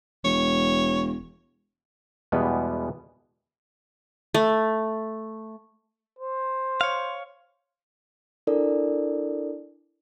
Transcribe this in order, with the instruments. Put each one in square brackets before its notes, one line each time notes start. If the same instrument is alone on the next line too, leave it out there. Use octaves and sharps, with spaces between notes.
[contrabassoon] E1 [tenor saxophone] C#5
[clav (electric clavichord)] E2 B2 G3 G#3 B3
[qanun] A3
[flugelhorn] C5
[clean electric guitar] C#5 F5
[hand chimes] D4 E4 A4 A#4 D5